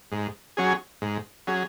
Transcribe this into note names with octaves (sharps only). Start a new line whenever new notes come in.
G#2
F#3 C#4 G#4
G#2
F#3 C#4 G#4